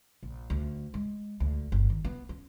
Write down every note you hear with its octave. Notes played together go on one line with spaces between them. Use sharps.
A#1
D2
G#3
D2
G1
D#3
B3
C#4